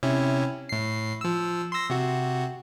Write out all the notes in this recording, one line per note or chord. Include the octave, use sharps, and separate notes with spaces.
C3 C#4 E4
A2 C7
F3 E6
C6 E6 A#6
C3 F#4